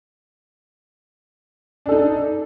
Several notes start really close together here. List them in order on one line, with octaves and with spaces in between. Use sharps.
D4 A4 D#4